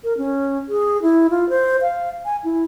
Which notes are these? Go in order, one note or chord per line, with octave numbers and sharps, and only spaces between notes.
A#4
C#4
G#4
E4
F4
C5
F5
G#5
E4